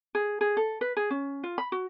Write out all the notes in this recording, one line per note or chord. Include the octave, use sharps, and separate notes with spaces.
G#4
G#4
A4
B4
G#4
C#4
F4
B5
F#4